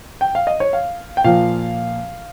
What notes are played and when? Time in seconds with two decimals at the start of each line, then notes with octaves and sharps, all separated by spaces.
0.21 G5
0.35 F5
0.47 D#5
0.60 C#5
0.73 F5
1.17 G5
1.24 A#2 F3 F5